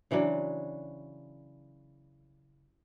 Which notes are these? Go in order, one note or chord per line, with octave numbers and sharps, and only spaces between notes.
C#3 E3 F#3 D4